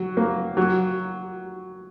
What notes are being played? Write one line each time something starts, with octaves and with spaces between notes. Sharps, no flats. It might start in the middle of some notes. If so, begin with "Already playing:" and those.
Already playing: F#3
A#3
F#3